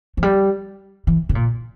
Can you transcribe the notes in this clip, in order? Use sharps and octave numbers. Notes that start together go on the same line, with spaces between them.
F3
G3
E3
C3
A#2